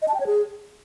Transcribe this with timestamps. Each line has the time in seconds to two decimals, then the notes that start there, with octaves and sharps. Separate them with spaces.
0.02 D#5
0.08 A5
0.14 G5
0.20 C#5
0.27 G#4